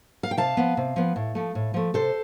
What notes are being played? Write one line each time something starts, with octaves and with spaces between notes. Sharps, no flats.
F5
G5
C3 F5 A5
F3 B3
C3
F3 B3
A2
F3 A3
A2
F3 A3
C3 A4 C5